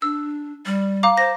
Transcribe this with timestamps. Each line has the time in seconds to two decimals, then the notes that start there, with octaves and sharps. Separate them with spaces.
0.02 D4 E6
0.66 G3
1.03 F5 A#5 D6
1.17 C5 A#6